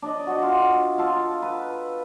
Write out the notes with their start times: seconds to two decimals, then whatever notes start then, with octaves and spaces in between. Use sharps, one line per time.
0.02 D4 D5 D#5
0.27 F#4 D#5
0.43 F4
0.98 F4 A4
1.42 B4